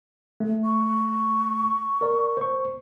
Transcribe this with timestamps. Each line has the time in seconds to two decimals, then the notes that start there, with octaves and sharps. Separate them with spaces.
0.40 A3
0.64 C#6
2.01 A#4 D5
2.37 C5 C#6